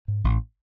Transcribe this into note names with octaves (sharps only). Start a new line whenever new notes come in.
G#2
A1